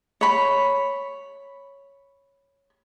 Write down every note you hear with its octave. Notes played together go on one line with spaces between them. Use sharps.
C#5 B5